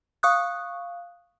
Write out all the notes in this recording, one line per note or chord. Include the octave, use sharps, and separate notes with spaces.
F5 C#6 D#6 F#6